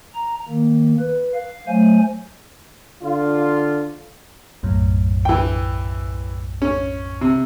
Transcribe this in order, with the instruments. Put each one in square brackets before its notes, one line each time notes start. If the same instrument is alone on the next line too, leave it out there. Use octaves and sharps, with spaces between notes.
[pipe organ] A#5
D#3 A#3
B4
F5
F#3 A3 C5 G#5
[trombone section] D3 F4
[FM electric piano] B1 F#2 A2
[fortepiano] E3 G5
C#4
C3